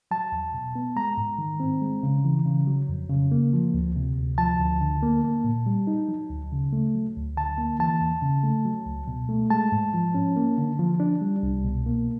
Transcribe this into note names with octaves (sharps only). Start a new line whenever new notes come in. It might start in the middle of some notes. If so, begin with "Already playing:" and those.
F#3 A5
E2
B2
B3
G#3 A#5
G#2
D#3
C4
G#3
C#3
E3
C#3
F#3
F2
C#3
A#3
F3
D2
C3
D2
F3 A5
D2
D3
A#3
A#3
A#2
G3
D#4
F#3
D2
C#3
A3
F#3
D2
D3 A5
A#3
E3 A5
E2
C#3
A3
F#3
C#2
B2
A3
G#3 A5
G#2
F3
C#4
A#3
D3
F3
D4
G3
C2
B2
A#3